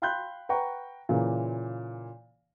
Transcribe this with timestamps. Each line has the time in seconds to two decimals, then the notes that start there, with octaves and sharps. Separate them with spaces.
0.02 F5 G5 B5 C6 F#6 G6
0.49 B4 F#5 G5 A#5 C#6
1.09 A#2 C#3 E3 A#3